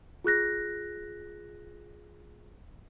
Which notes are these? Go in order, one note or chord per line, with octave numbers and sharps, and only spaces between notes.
F4 G#4 F#6 A#6